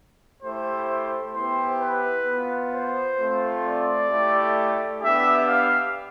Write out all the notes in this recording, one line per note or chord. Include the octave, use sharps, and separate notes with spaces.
A3 E4 G4 C5
B3 E4 G4 C5
B4
B3 F4
C5
A3 C4 F4
D5
A3 E4 G4
B3 D4 G4 E5
F5